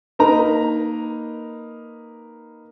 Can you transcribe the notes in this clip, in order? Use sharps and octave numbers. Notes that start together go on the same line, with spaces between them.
A#3 D#4 B4 A#5